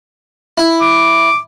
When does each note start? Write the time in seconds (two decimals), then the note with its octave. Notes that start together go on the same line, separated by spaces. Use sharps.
0.58 E4
0.81 D6